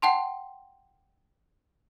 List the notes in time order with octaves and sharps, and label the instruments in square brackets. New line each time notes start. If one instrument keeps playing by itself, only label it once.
[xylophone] F#5 G5 A5 C6